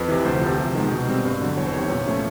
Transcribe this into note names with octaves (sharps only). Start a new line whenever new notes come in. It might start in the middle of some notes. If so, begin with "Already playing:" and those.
Already playing: F2 B4
C3 E3
D2 C5
C3 F3
C3
D#3 G#3 B3
B2
G3 C4
G2
D3 F#3
E2 C#5
C5
C3 D#3 C#5
A#2
F3 A3 C#4